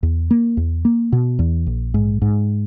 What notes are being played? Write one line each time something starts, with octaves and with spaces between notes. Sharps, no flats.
E2
A#3
E2
A#3
B2
E2
A#1
G#2
G#2